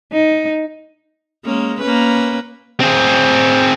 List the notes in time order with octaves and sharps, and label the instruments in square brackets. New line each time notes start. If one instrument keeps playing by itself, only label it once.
[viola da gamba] D#4
G#3 A#3 C#4
A#3 C#4 B4
[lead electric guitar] C4 G#4